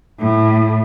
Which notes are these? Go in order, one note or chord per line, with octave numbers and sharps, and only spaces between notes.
A2